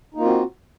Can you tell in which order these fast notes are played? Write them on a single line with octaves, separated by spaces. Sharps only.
D#4 A#3 F4 C4 F#4